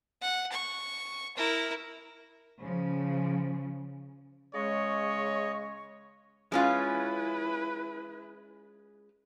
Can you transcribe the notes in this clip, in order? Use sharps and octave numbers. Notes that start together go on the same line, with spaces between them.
F#5
C#6
E4 A#4
C#3 F3
C#3 G#3 C#5 D#5 C#6
G#3 C#4 E4 F4 B4